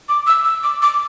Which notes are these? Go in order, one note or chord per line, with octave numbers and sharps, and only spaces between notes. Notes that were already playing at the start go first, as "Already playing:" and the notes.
D6
E6
E6
D6
D6